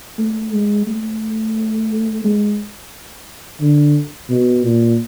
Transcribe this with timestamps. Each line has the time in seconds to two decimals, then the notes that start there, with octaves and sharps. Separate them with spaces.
0.19 A3
0.53 G#3
0.87 A3
2.24 G#3
3.61 D3
4.30 B2
4.63 A#2